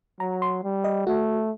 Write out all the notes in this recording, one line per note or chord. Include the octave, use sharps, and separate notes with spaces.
F#3 A#5
C6
G3
D#5
A3 F#4